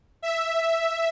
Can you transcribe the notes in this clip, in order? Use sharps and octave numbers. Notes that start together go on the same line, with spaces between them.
E5